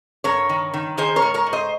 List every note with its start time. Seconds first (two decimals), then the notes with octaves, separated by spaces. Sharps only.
0.24 G2 A#4 C#5
0.49 D#3
0.74 D#3
0.97 D#3 G#4 C5
1.16 A#4 C#5
1.22 G#2
1.34 A#4 C#5
1.47 G#2
1.53 C5 D#5